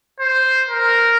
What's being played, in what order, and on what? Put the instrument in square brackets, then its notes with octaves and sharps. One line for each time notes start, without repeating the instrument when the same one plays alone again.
[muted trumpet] C5
A#4